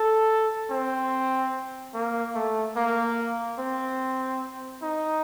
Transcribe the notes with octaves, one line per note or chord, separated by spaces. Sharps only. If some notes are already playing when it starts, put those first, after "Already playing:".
Already playing: A4
C4
A#3
A3
A#3
C4
D#4